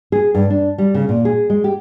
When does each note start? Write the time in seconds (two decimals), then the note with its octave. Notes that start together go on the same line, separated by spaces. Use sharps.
0.12 G#4
0.35 G2
0.50 D4
0.78 G3
0.94 C#3
1.09 A#2
1.25 G#4
1.50 G#3
1.64 G4